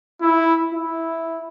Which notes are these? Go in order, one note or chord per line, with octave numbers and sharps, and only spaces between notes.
E4
E4